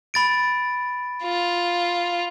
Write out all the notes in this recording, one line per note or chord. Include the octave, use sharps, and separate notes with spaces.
B5 A6 D7
F4